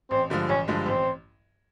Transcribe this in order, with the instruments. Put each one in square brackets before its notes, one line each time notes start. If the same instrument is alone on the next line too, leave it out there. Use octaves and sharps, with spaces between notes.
[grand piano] A1 [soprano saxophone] C4
[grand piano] G2 D3 F3 G#3
[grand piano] A1 [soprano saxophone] C#4
[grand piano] G2 D3 F3 G#3
[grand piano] A1 [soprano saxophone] C4